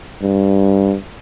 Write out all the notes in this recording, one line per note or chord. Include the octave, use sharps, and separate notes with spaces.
G2